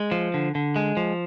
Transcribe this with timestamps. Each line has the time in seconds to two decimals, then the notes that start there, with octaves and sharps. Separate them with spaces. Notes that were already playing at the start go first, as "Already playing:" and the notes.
Already playing: G#3
0.12 F3
0.34 D3
0.55 D3
0.76 G#3
0.97 F3